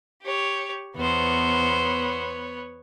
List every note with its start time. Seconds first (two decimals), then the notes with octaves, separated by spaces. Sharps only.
0.22 G4 C#5
0.97 E2 B3 C5 C#5